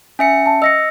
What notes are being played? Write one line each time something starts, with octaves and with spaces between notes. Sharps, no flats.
C#4 E5 G#5 C#7
A5
D#5 E6 A#6 C#7